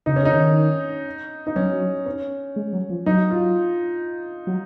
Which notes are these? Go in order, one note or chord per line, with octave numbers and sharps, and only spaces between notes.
C#3 D#4
C#4
C#3 D#4
D#3
D#4
F#3 C#4
C#4
G#3
F#3
F3
F#3 D#4
F4
F#3